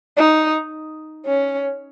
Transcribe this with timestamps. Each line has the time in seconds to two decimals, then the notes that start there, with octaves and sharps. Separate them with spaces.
0.17 D#4
1.26 C#4